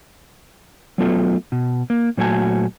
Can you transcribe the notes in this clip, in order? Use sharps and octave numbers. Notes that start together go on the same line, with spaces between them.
F#3 A3 B3 F4 A4
B2
A#3
A#2 F#3 A3 F#4 G#5 A5